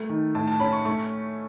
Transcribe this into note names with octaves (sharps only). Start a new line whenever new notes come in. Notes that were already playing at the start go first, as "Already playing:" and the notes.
Already playing: A3
D#3
A2 A5
A5
C#4 B5
C#6
A3 C#6